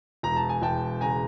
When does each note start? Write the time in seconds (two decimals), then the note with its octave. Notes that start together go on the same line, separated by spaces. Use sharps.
0.23 E1 A#5
0.36 A5
0.49 G#5
0.62 E1 G5 A5
1.01 C#3 G#5 A#5